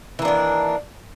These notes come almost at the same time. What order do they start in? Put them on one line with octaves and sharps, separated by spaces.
E3 A#3 D4 D#3